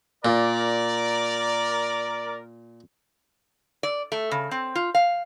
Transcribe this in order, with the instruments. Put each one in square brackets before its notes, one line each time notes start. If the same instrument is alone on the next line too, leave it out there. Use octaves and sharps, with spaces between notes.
[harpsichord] A#2 [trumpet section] A#4 D5
[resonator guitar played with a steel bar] D5
A3
C#3
C4
F4
F5